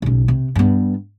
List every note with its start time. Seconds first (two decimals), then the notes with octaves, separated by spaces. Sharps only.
0.02 B1 C#3
0.28 C3
0.55 G2 B3